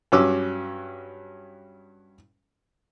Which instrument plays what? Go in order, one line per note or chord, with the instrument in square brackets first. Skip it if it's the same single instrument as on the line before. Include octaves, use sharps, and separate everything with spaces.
[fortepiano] G2 F#3 C#4 D6 E6